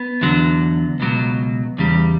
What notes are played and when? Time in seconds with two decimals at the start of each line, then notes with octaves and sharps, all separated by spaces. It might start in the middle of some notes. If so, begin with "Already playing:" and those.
Already playing: B3
0.21 E2 D3 F#3
1.00 C#2 B2 F#3
1.78 E2 C#3 G3